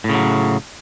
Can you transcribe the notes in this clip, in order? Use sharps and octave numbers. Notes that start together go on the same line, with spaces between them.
A2 C#3 F#3